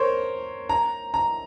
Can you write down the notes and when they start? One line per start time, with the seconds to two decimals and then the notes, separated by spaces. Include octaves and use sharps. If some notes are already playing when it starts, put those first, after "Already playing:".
Already playing: A#4 C5 C#5
0.69 A#5
1.14 A#5